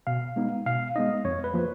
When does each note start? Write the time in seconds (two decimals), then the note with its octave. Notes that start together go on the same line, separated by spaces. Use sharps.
0.07 B2 F5
0.36 G#3 B3 D#4
0.66 B2 F5
0.95 G#3 B3 D#4 D#5
1.25 F2 C#5
1.44 B4
1.53 F3 A#3